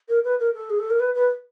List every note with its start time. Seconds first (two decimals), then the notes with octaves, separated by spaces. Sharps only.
0.09 A#4
0.25 B4
0.40 A#4
0.54 A4
0.70 G#4
0.79 A4
0.90 A#4
1.00 B4
1.15 B4